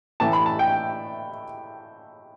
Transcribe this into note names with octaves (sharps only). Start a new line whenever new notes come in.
A2 E3 A3 A5
B5
A5
G5